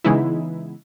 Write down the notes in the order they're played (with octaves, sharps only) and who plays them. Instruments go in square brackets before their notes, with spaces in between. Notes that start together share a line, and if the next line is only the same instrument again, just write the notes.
[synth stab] C#3 E3 G#3 B3 D#4 E4